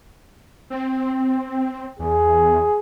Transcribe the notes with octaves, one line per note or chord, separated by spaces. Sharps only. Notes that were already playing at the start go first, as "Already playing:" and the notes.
C4
E2 G#4